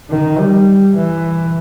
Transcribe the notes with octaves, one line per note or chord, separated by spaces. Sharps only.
D#3
G3
E3